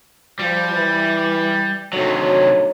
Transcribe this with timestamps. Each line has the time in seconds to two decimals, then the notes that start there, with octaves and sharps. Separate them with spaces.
0.39 F3 G3
0.74 E3
1.93 D2 C3 F#3 D#4 C#5